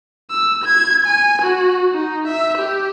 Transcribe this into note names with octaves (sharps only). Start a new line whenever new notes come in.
E6
G#6
G#5
F#4
D#4
E5
G4